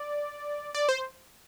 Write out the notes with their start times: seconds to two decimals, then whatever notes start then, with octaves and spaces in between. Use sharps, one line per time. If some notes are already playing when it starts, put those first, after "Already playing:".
Already playing: D5
0.75 D5
0.89 C5